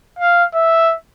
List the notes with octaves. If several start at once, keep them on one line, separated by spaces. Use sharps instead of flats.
F5
E5